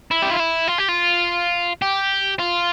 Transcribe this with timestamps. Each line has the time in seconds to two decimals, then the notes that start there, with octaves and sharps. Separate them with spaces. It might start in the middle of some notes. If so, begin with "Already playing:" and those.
0.11 E4
0.22 G4
0.31 F4
0.40 E4
0.68 F4
0.78 G4
0.89 F4
1.82 G4
2.39 F4